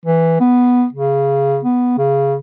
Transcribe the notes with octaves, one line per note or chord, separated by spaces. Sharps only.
E3
B3
C#3
B3
C#3